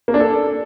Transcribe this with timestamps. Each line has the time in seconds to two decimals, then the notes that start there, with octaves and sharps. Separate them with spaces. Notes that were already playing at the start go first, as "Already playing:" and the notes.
0.08 A#3
0.14 D4
0.20 A4